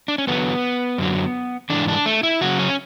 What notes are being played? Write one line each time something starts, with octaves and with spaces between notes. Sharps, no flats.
D4
C#4
E2 D3 F#3 B3
F#2 D3 F#3
G#2 E3 D4
D4
A3
E4
F#2 C#3 F#3 F#4
C#4